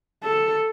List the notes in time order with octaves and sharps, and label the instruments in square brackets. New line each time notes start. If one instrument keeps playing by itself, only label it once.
[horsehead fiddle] A4